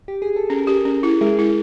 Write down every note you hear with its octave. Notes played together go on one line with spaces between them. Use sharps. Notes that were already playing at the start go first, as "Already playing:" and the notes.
G4
G#4
A4
C#4 G#4 A#4
G4
C#4
E4
G#3 G#4 A#4
E4